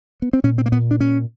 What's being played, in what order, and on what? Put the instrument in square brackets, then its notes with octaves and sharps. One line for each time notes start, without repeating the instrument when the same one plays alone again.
[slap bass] B3
C4
A#2 C#4
C4
A#3
A#2 B3
D4
A#2 C#4